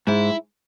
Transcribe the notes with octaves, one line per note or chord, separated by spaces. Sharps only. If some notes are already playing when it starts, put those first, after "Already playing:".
G#2 E4